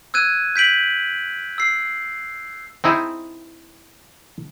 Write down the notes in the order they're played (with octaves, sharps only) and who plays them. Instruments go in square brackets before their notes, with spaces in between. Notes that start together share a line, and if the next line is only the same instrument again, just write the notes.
[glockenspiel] E6 F#6 G#6 D#7
G6 B6 D7 F#7
E6 C7
[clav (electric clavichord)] C4 D#4 E4 G#4